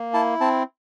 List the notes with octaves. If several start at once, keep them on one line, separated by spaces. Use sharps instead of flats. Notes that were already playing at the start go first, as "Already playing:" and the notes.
Already playing: A#3
E4 A5
C4 A5